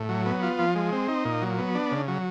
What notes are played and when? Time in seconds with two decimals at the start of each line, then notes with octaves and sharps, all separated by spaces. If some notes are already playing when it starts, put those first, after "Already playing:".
Already playing: A2
0.09 F#3
0.26 B3
0.42 F4
0.59 F3
0.75 G#3
0.92 C4
1.08 D#4
1.25 A#2
1.42 F#3
1.58 B3
1.75 D4
1.91 C#3
2.08 F#3